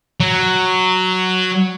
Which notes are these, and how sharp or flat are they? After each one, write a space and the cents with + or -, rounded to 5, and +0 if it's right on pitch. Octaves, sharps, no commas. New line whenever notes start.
F#3 +0